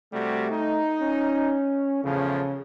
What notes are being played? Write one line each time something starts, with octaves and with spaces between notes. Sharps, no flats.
C3 G3 A3 F#4
D#4
C#4
E2 A2 C#3 F3